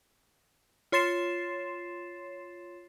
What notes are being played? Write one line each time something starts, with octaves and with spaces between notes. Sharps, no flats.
F4 C#5 C6 A6 C7 E7